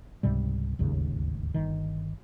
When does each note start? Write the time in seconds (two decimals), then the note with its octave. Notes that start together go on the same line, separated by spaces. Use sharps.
0.23 C#2 G#2 C3 G3
0.79 D1 G#1 D#2 C#3
1.54 G1 D#3